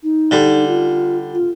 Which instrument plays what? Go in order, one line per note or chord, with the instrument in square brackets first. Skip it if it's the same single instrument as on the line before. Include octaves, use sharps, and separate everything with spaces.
[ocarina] D#4
[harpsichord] D3 G3
[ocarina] F4
F4